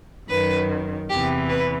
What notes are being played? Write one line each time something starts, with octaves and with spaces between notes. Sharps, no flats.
F#2 D#3 B4
E2 C3 E3 G4
B4